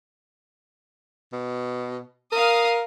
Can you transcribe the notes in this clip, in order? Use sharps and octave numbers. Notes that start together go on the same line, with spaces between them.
B2
A#4 F5 D#6